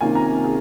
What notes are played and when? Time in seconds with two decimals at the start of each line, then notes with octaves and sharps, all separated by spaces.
0.01 C3 D#3 A#3 C#4 F4 G#5
0.15 A#5
0.44 G#4